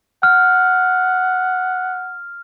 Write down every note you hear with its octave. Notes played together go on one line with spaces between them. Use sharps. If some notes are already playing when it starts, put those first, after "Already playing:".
F#5 F6